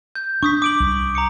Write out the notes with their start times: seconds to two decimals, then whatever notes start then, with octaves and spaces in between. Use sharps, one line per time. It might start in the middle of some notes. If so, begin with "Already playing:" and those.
0.15 G6
0.43 D4 C#6 D#6 B6
0.62 D6 D7 F#7
0.80 C2
1.15 A#5 D6 C#7